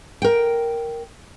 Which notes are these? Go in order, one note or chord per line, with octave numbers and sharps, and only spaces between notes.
A#4 G5